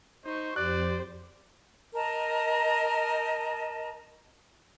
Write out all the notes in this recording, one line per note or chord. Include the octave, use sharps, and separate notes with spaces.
D#4 C5 C#6
F2 G4 C5 D5 F#6
A#4 D#5 A5